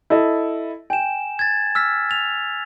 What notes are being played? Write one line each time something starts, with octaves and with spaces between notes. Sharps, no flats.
E4 A4 D#5
G5 G#5 E7
G#6 A6
E6 F6 B6
A6 F7